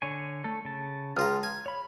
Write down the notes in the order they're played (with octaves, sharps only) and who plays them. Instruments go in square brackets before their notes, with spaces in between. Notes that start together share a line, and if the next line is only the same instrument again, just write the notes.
[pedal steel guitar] D3 C#5 G#5
A3 A4
C#3 A5
[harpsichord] C#2 F4 A#5 [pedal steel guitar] A5 D#6 F6
[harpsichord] G#5
[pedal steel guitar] C#5 B5